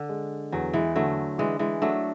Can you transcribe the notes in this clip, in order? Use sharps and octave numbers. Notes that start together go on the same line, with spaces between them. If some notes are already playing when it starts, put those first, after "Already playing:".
Already playing: D3
G#3
E2 F#3
E3 G#3
D3 F#3 A3
E3 G#3 D4
E3 G#3
F#3 A3 D4